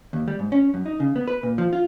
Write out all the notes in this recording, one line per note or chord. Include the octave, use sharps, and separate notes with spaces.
D#2
G3
G#2
C#4
F#2
D#4
C#3
B3
B4
A#2
F3
F4